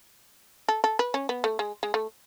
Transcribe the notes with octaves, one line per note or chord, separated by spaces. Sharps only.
A4
A4
B4
C#4
B3
A3
G#3
G#3
A3